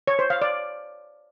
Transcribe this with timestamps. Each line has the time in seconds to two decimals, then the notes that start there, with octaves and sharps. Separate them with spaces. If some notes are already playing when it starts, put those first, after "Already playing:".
0.07 C#5
0.19 C5
0.30 F5
0.42 D5